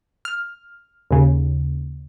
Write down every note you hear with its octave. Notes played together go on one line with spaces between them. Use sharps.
F6
D#2 C#3